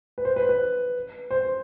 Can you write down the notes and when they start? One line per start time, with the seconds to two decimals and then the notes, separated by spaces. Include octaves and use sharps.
0.18 B4
0.25 C5
0.36 B4
0.49 B4
1.31 C5